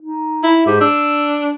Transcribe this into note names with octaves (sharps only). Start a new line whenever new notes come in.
D#4
E4
G#2 G4
D4 E6